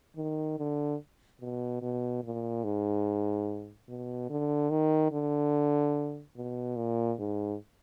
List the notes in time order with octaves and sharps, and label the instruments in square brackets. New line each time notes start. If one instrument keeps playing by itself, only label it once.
[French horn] D#3
D3
B2
B2
A#2
G#2
B2
D3
D#3
D3
B2
A#2
G#2